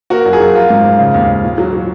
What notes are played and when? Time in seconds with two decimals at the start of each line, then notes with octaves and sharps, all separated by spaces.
0.10 A#3 F#4 A#4
0.26 F#2
0.33 F4 G#4
0.40 F#2
0.55 F3 F4
0.70 G#2
0.85 G#2
0.99 C#3
1.14 D#2
1.29 D#2
1.43 A#2
1.58 F#3
1.73 F#3